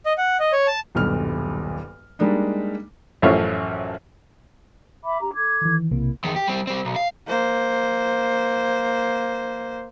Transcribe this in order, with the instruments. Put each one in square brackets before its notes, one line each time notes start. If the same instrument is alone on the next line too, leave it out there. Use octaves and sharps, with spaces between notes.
[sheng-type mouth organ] D#5
F#5
D#5
C#5
A5
[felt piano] D#1 B1 G2 F6
G3 G#3 A#3 D4 D#4
[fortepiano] A1 F#2 F3 A3 C#5 F5
[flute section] E5 B5 D6
D4 G4 A#5
A4 D6 G#6
[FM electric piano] D#3 E3
[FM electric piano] B1 C3 A#3 [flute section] E4
[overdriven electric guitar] E2 D#3
G4
G3 C4
G3 C4
B1
F5
[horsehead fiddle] A#3 C5